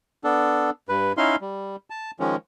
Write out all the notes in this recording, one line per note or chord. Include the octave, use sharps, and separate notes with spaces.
B3 D4 A4
G2 B4
C#4 D#4 E4 F5 C6
G3
A5
D#3 F3 G#3 C#4